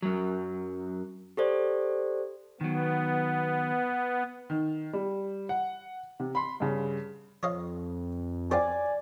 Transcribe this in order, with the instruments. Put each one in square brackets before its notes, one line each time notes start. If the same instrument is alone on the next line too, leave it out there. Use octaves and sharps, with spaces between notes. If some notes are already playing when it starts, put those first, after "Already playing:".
[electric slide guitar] F#2 F#3
[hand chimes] G4 A4 C5 D5
[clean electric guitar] D#3 F#3 [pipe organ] B3
[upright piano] D#3
G3
F#5
C3
B5 C6
G2 C#3
[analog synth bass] F2 [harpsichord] C#5 D#5 F5
[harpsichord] F4 G4 C5 [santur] D5 [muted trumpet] G#5